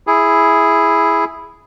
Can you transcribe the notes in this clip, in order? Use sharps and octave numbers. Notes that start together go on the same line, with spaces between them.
E4 G#4